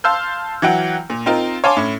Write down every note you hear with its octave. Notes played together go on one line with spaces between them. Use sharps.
F5 A5 C6 E6 F6 G6
E3 F#3 F#5 G5
A#2
C4 D#4 F4 A#4
C#5 F5 G#5 A5 C6 D6
A2 C#4